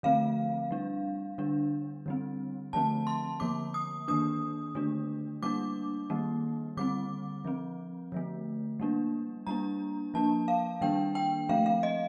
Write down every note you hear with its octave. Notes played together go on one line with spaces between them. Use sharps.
D3 F3 A3 C4 F5
G3 D4
D3 G3 D4
D3 G3 C4
D3 F3 A3 C4 A5
C6
D3 F3 A#3 D6
D#6
D#3 A#3 D4 D#6
D3 A3 D4
G3 A#3 D4 D6
D#3 G3 A#3
D3 G3 C4 D6
F3 C4
D3 F3 A3
G3 A#3 D4
G3 A#3 D4 A#5
F3 A#3 D4 A5
F5
D#3 G3 A#3 D4 G5
G5
F3 A3 C4 F5
F5
D#5